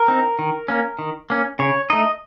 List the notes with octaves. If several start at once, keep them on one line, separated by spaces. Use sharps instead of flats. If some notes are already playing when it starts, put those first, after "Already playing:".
Already playing: A#4
C4 D#4
D#3
A#3 C#4
D#3
A#3 C#4
C#3 C#5
A3 D#4 D#5